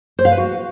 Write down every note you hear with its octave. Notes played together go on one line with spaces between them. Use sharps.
C5
F5
B4
F#4